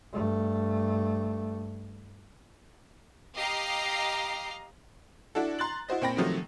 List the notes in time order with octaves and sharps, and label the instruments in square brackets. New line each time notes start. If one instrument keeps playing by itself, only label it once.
[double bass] G2 A3
[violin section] G4 D#5 F5 A#5 C7
[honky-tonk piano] D4 E4 F#4 A4
A#5 C6 F#6 A6 F#7
E4 F#4 C5 D#5
A#2 C4 G5 B5 A#6
C3 D#3 F3 F#3 A3